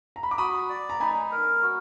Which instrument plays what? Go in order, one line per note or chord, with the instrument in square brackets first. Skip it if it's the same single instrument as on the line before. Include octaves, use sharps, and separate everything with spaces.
[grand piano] A#5
B5
D6
[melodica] F#4 [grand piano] B5 D#6
[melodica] D5
[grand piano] A#5
[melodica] D#4 [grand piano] G#5 B5
[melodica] A#4
F#4